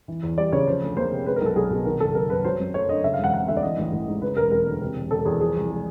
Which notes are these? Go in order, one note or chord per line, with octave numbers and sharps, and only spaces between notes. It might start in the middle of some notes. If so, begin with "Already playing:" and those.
E3
E2
G3 D5
C#3 C#5
F3 C5
D2
A#3 C5
C3
G#3 B4
B1 A#4
A4
B1 G#4
B2 G#4
D#3 A#4
F#1 A4
F#1 A#4
F#2 B4
F#3 C5
F#2
A3 C#5
D3 D#5
C#3 E5
F5
E1 F#5
E1 F#5
D2 E5
D5
E3 D#5
A1
A1
G#2
C#3 B4
E1 A#4
E1 A#4
D2
C3
E1
E1 A4
E2 G#4
F3 G#4
C2
G#3